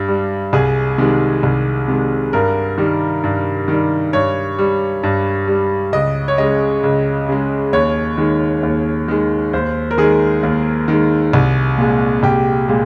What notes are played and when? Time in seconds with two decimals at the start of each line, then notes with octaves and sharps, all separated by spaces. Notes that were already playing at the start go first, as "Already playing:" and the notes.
Already playing: G2
0.08 G3
0.53 C2 G#4
0.98 C3 D#3 G#3
1.43 C2
1.88 C3 D#3 G#3
2.33 G2 A#4
2.78 D#3 G3
3.24 G2
3.68 D#3 G3
4.13 G2 C#5
4.58 G3
5.03 G2
5.48 G3
5.93 C#2 D#5
6.28 C#5
6.38 C#3 G#3 D#5
6.83 C#2
7.29 C#3 G#3
7.73 D#2 C#5
8.18 D#3 G#3
8.63 D#2
9.08 D#3 G#3
9.53 D#2 C5
9.91 A#4
9.98 D#3 G#3 G#4
10.43 D#2
10.88 D#3 G#3
11.33 C2
11.78 A#2 G#3
12.23 C2 G4
12.68 A#2 G#3